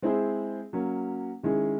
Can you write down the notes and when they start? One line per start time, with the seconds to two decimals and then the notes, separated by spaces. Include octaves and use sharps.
0.02 G#3 C4 E4 G#4 C5
0.73 F#3 A#3 C#4
1.43 D#3 G#3 C#4 E4 G#4